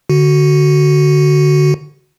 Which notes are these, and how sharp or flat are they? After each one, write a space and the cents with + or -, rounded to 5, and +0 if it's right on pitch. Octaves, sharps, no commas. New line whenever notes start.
D3 +0 F#4 +5